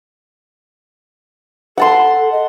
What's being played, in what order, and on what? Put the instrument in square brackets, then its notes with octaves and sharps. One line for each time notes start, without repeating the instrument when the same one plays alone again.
[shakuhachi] A4 [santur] F#5 A5 C6
[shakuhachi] D#5